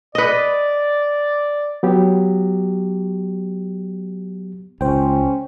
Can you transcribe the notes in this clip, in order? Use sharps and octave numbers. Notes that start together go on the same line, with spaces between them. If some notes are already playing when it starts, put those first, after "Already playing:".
B4 D5 D#5
F#3 B3 G4
C#2 C#4 C5 G5